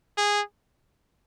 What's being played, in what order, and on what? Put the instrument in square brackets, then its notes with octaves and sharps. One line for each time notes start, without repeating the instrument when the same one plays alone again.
[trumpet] G#4